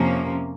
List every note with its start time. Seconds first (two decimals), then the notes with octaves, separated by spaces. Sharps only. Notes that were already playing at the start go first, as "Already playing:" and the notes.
Already playing: F2 C3 F3 A#3 C#4